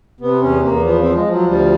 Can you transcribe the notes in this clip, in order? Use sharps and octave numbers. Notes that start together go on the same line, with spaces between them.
C3 B3
E2 C#4
E2 A#3
F3 B3
C4
F3
G#3
F3
F#3
D2 G3